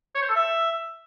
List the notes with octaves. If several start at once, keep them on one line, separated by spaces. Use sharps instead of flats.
C#5
C5
A4
E5